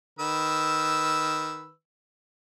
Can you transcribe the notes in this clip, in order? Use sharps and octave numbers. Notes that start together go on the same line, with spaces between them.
D#3 B4 E6